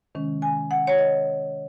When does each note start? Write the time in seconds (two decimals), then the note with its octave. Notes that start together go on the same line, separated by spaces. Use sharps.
0.15 C3 D#3 G#3 C#4
0.42 G#5
0.71 F#5
0.87 C#5
0.98 D#5